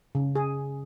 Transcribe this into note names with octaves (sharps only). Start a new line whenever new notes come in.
C#3
G#4